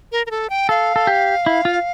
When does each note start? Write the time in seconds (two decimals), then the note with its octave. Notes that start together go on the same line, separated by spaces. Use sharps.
0.12 A#4
0.26 A#4
0.31 A4
0.50 G5
0.69 A4 F5
0.96 A4
1.07 G4
1.46 E4
1.65 F4